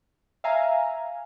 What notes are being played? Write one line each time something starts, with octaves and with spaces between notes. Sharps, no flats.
E5 F5 G#5 A#5